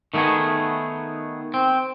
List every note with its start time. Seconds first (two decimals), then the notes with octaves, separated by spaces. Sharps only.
0.14 D#3 A3 B3 D#4 G#4
1.54 C4